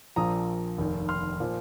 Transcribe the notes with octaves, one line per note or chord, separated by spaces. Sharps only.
A#1 A#2 F3 A#5 D#6
F1 D#2 D#3
C6 F6
A#2 F3